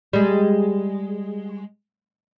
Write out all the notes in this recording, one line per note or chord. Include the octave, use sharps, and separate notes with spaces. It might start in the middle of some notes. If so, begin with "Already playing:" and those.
G3 G#3